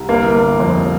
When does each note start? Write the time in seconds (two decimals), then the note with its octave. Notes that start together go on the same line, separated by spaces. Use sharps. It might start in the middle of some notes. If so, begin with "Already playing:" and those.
Already playing: C2
0.08 G1 A#3
0.34 G1
0.60 F2